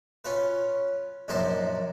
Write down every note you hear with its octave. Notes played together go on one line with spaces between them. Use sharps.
C#4 F4 B4
A#1 F#2 C3 D#4 C5 A5